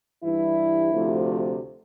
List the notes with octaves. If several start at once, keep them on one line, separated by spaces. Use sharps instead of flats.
G2 E3 G3 E4
D2 C3 F3 A3